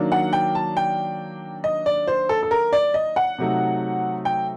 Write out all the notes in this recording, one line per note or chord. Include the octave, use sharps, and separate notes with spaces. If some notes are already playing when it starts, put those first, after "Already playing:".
Already playing: D#3 F#3 A#3 D4
F#5
G5
A5
G5
D#5
D5
C5
A4
A4
A#4
D5
D#5
F#5
C3 F#3 A3 D#4
G5